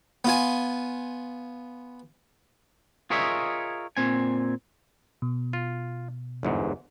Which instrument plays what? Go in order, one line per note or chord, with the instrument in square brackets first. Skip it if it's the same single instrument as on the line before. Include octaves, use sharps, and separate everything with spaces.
[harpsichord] B3 F4 G#5
[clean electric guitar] F4 G#4 A#4 C#5 D#5 E5
A#2 C4 G#5
[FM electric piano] B2
[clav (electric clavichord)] F4
G1 E2 G#2